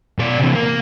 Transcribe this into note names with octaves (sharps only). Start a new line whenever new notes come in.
B2 D5
C3 E3
A#3